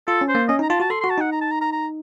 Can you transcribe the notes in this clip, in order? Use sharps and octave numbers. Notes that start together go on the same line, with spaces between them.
F4 A4
C#4
C5
A#3
C#4 D#5
D#4 A#5
F4 A5
F#4 A5
A4 C6
C6
F#4
A5
D#4 F#5
A#5
A5
A#5
A#5
A#5